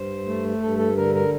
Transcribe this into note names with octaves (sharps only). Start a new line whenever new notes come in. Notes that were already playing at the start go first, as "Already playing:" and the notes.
Already playing: G2 C5
A3
G2 A4
A4
D3 A#4
A#4